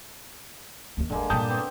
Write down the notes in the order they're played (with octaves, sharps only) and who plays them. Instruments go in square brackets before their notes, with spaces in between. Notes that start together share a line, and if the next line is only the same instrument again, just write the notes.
[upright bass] D#2 A#3
[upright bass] G1 D#2 [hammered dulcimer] D3 G#3 A#3
[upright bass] G2 A#2 [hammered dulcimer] G4 [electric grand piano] A5 D#6 G6
[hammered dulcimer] B3 C4